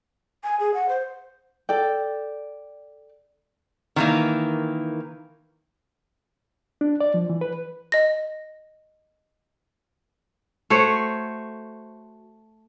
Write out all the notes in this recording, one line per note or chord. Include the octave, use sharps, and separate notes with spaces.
G#5
G#4
F#5
C5
A4 D5 G5
D#3 E3 A#3
D4
D5
F3
E3
B4
D#5 A#6
A3 F#4 C5 C#5